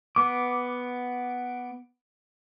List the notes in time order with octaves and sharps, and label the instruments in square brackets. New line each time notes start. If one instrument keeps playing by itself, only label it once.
[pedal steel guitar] B3 D6